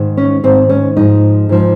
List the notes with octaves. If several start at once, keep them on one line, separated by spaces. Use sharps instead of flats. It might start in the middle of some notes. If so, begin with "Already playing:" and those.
Already playing: G#2 D#3
C#4
G#2 D#3 C4
C#4
G#2 F3 D#4
G#2 F3